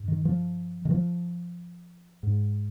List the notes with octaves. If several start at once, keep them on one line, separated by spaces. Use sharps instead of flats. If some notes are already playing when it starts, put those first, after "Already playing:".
Already playing: G2
D#3
F3
D#3
F3
G#2